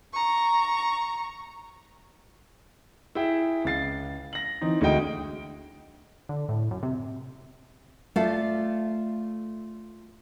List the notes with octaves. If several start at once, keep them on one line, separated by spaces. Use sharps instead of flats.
A#5 C#6
E4 G#4 E5 G5
C#2 F5 A6 C7
A#6 F#7
E3 C4 D#4
D2 G#3 F#4 D#5 G5 D7
D3
A2
F#2
C3
A3 F4 D5 F5 A5